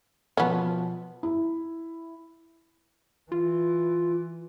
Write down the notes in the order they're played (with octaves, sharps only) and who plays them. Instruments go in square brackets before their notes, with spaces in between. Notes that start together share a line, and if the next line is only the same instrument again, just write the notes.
[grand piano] B2 F3 [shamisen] B3 C#4
[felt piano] E4
[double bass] E3 [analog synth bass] F4